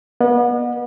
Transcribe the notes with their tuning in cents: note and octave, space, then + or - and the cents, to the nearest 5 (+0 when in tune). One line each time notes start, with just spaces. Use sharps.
B3 -35 D#5 -45